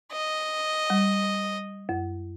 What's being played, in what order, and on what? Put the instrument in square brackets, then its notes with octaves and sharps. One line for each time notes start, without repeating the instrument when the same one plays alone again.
[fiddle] D#5
[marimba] G3
F#2